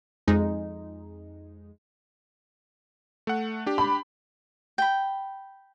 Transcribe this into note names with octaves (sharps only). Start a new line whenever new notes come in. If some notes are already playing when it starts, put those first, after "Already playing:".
F2 G#3 D#4
A3 F#5
D4 G4
B5
G5 B5